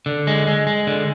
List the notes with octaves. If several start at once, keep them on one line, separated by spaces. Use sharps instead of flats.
D3
G#3
G#3
G#3
D3